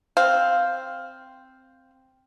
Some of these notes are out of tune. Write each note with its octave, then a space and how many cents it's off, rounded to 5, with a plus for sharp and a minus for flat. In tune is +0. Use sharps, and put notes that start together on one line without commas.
C4 +0 F5 +0